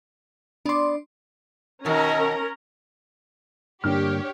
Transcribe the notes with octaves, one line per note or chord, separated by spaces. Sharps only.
B3 D4 D5 C6
B2 D#3 C#4 A#4 A#5
G2 D3 A#3 D4 G4 C#5 F6